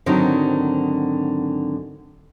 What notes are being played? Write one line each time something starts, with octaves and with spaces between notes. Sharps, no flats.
G#2 D3 D#3 F#3 C4 D#4